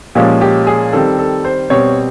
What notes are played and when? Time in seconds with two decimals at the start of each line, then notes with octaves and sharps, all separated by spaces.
0.15 A#2 F3 G#3 C#4 G4
0.41 G4
0.67 G#4
0.93 D#3 G3 C4 A4
1.19 A4
1.45 C5
1.70 B2 G3 C4 C#5